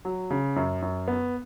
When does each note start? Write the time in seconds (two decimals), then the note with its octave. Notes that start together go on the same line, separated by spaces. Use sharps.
0.05 F#3
0.31 C#3
0.56 F#2
0.82 F#2
1.08 B3